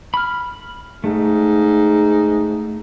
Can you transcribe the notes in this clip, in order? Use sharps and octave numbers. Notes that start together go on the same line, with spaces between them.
B5 F6
G#2 A3